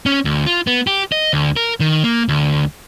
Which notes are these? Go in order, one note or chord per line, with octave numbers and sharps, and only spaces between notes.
C#4
D2
F4
B3
G4
D#5
D2
A#4
D#3
A#3
D2